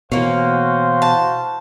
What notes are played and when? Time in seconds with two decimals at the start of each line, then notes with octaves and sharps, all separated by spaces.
0.12 B2 E3 A#3 C#4 F#4 C5 F5
1.02 A5